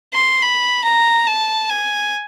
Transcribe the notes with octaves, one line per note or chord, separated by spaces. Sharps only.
C6
B5
A#5
A5
G#5